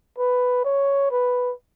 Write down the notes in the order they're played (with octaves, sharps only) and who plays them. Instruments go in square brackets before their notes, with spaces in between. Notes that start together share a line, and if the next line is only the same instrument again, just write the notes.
[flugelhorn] B4
C#5
B4